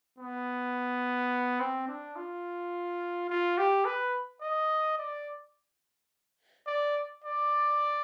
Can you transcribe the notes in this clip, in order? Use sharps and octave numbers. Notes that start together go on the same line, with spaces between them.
B3
C4
D4
F4
F4
G4
B4
D#5
D5
D5
D5